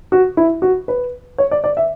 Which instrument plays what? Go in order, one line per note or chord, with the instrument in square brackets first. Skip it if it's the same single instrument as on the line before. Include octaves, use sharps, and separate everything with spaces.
[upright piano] F#4
E4
F#4
B4
C#5
D5
D5
E5